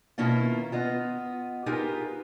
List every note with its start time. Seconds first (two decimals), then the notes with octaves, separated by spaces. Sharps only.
0.18 B2 D#3 A#3 C#4 E4 F4
0.72 B3 F4 D#5
1.66 D#4 F4 G4 G#4 A#4 B4